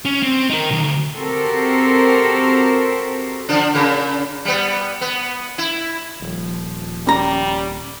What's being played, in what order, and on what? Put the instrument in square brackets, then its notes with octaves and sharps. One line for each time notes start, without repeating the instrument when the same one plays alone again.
[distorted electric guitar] C#4
C4
D#4 A#4
B1 D#3
D2
[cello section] C4 F#4 G4 A4 A#4 C5
[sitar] D3 F3 D4
A#2 C#3 A#4
G3 B3
B3
E4
[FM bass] D#1 [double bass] F3
[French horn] G3 [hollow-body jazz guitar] C#4 A#5